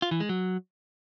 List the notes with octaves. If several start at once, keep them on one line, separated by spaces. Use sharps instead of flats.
F4
E3
G#3
F#3